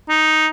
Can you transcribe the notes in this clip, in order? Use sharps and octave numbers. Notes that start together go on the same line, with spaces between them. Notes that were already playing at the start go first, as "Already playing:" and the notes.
D#4